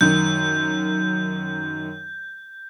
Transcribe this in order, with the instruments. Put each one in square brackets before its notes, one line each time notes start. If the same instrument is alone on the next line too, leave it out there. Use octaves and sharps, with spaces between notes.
[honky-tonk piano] F#2 D#3 [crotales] G6